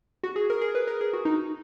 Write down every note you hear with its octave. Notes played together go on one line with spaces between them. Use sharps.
F#4
G#4
A#4
G#4
B4
A#4
G#4
F#4
D#4